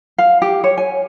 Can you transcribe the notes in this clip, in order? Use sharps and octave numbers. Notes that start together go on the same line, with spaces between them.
F5
G4
C#5
G#5